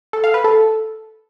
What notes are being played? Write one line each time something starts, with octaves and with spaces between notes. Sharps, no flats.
A4
F5
B4
A4